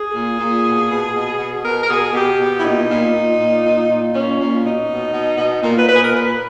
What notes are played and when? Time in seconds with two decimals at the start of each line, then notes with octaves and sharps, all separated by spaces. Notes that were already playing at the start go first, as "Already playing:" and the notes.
Already playing: G#4
0.14 A#2
0.39 A#2
0.64 B2
0.89 B2
1.15 B2
1.39 B2
1.63 B2 A#4
1.84 A#4
1.89 B2 G#4
2.14 B2 G4
2.39 B2
2.60 E4
2.63 A#2 D#4
2.89 A#2
3.14 A#2
3.39 A#2
3.64 A#2
3.89 A#2
4.13 A#2 C#4
4.39 A#2
4.64 B2 D#4
4.89 B2
5.14 B2
5.38 B2
5.63 A#2 A#4
5.75 B4
5.88 A#2 B4
5.95 G#4
6.01 A#4
6.14 A#2 B4